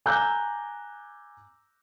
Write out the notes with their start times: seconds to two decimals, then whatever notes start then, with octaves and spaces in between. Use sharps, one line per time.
0.06 G#5 A#5 D6 E6 F#6 G6